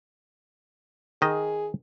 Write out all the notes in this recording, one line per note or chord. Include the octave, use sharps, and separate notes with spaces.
D#3 G#4 D#5